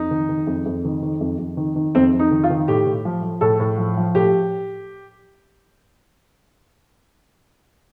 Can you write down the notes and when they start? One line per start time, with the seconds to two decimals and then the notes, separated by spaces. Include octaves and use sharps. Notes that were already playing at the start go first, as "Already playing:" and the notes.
Already playing: F2 D#4
0.11 D#3
0.29 D#3
0.47 F2
0.66 F2
0.84 D#3
1.02 D#3
1.21 F2
1.39 F2
1.57 D#3
1.76 D#3
1.95 F2 C4
2.13 F2
2.19 D#4
2.31 D#3
2.44 F4
2.50 D#3
2.68 A2 G4
2.87 A2
3.05 F3
3.23 F3
3.41 A2 A4
3.60 A2
3.78 F3
3.97 F3
4.15 A2 G4